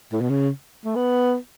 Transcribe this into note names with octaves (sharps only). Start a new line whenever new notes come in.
A2
B2
C#3
A3
B3